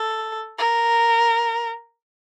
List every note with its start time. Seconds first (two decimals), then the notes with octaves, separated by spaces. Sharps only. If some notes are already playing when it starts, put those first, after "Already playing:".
Already playing: A4
0.58 A#4